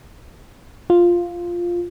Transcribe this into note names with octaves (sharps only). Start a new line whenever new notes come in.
F4